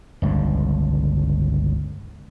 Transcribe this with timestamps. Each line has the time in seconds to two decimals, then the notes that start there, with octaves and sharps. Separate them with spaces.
0.22 G1 C#2 G2 D3